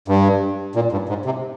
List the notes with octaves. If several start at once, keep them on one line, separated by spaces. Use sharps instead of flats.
G2
A#2
G2
G#2
C3